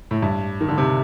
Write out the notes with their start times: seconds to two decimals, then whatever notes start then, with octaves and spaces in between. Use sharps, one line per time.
0.11 A2
0.22 G2
0.61 D#3
0.68 D3
0.78 C3